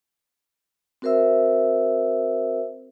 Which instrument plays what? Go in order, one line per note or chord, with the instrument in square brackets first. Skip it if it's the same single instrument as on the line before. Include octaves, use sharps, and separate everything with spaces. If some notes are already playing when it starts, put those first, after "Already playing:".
[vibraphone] C4 F#4 A#4 C5 E5 E6